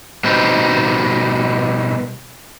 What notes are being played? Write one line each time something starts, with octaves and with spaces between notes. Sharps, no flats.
B2 G3 C4 D#4